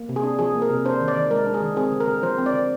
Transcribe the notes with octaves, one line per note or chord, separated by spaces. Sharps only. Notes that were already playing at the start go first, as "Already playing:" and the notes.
Already playing: A#3
C3
G#4
D4
F3 G#4
A#3
A#4
C3
D4 C5
D#3
D5
D#3
G#3 A#4
D4
G#4
D#3
C4 G#4
D3
A#4
D3
F3 C5
C4
D5
D3